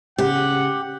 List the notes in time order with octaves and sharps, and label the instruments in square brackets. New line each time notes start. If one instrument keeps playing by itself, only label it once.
[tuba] C#3 [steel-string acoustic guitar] G4 [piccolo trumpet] F#5